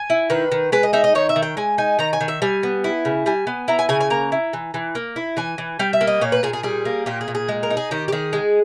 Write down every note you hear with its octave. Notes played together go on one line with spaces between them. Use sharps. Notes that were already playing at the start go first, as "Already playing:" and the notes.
Already playing: G#5
E4
D#3 B4
D#3
G#3 B4
D#5
D#4 E5
D#5
D#3 C#5
E5
D#3
G5
G#3 G#5
D#4 G#5
D#3 A#5
G#5
D#3
E5
G3 G#5
B3
E4
C#3
G3 G#5
B3
E4 A#5
G#5
C#3 G#5
G#5
A#3 A#5
E4
E3
E3
A#3
E4
E3 G#5
E3
G3 G5
E5
A#3
D#5
A#2 C#5
B4
A#2 G#4
G#4
G3 G#4
A#3
A#2 G4
G#4
A#2
G#4
G#3
A#4
D#4
G#4
D#3 G4
G4
D#3 G#4
G#3